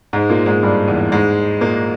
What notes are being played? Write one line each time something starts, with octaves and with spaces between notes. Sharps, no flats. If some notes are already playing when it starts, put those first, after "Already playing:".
G#2 G#3
A#2 A#3
G#2 G#3
G2 G3
E2 E3
G#2 G#3
A#2 A#3